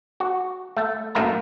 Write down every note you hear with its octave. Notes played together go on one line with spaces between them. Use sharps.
F#4
A3
F#2 A2 A3 A#3 A#5